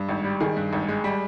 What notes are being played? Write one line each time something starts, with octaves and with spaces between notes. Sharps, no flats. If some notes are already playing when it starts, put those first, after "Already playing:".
Already playing: G2
G#1
G3
D#3 G#4
G2
G#1
G#3
G3